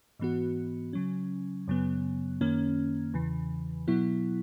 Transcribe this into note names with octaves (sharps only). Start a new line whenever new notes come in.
G#2 E3 B3 F#4
C#3 F#3 C#4
F#2 C#3 F#3 B3
F#2 D#3 A#3 C#4
E2 C#3 E3
B2 F#3 B3 E4